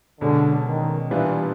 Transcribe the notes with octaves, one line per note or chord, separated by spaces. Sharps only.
B2 D3 G#3 C#4
D#3
A#2 E3 G3 B3 D4 F4